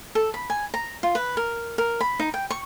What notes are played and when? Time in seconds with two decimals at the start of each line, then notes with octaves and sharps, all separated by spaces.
0.15 A4
0.34 B5
0.50 G#5
0.74 A#5
1.03 F4
1.15 B4
1.37 A#4
1.78 A#4
2.01 B5
2.20 D#4
2.34 G5
2.50 C#6